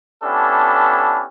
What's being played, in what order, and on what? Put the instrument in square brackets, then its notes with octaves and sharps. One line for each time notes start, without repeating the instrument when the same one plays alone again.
[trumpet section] B3 C#4 D4 E4 G4 A4